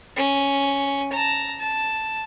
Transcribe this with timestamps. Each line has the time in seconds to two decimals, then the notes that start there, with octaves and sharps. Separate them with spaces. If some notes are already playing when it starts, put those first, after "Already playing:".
0.16 C#4
1.12 A5 A#5
1.59 A5